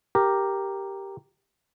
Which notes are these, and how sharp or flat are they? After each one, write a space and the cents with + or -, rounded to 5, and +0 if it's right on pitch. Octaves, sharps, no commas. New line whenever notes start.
G4 +0 A#4 +0